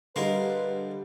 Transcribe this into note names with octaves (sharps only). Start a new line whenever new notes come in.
D3 G3 G#3 A#4 B4 F5